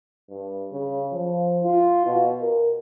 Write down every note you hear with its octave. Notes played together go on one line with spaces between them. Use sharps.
G2
C#3
F3
F4
B2
A#4